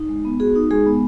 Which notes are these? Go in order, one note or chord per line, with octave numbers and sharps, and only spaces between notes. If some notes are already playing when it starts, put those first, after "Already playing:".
Already playing: D#4
G#3
B3
F#4 G#4
D#4
G#3 G#4
B3